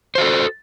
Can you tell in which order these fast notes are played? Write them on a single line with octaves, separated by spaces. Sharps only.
C5 F#4 A4